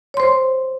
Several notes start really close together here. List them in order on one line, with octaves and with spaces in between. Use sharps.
C#5 C6 C5